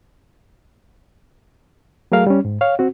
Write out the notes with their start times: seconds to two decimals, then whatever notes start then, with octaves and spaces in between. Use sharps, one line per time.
2.12 F#3 A3 G#4 A#4 F5
2.27 G3 C#4
2.45 G#2
2.61 C#5 F5
2.79 C4 F#4